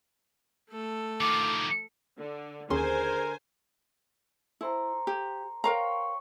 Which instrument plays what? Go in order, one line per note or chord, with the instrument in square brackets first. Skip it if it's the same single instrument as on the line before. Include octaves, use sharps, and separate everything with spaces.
[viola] A3 A4
[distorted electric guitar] D#3 F3 [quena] D6
[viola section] D3
[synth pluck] D#2 C#4 C6 [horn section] D3 A#4 [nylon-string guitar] G#4 [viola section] C5 G#5
[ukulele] E4 [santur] A4 C5 A#5
[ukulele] G4
[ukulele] A#4 F5 A#5 [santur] C#5 G5 C6